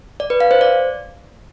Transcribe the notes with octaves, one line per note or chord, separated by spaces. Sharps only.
D5
B4
F5
C5
D5